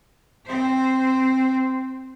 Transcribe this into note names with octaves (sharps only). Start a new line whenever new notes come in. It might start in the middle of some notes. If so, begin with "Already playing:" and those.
C4 C5